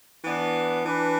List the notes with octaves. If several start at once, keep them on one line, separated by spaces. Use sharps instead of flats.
E3 B3 D4
E3 D4 B4